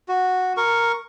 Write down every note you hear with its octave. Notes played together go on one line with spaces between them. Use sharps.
F#4
A#4 C#6